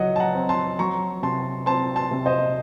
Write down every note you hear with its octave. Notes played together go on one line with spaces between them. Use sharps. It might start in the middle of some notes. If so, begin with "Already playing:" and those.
Already playing: C#2 F#3 D#5 F#5
A5
F#5 A#5
C4
A5 C6
F#3 A#5 C#6
C3 A5 C6
C4 A5 C6
A5 C6
C3
C5 D#5